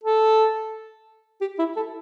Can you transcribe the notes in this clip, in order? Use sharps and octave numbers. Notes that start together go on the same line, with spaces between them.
A4
G4
E4
A4